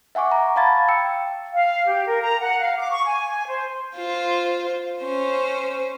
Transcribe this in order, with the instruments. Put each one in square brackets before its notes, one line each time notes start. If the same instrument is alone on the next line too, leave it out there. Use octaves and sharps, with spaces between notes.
[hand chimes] E5 F#5 G#5 C#6 D6
A#5
F5 A5 B5 G#6 A6
G5 E6 C#7
[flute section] F5
G4
A#4
A#5
F#5
F5
D6
C#6
G#5
G#5
C5
[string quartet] F4 C5
C#4 C5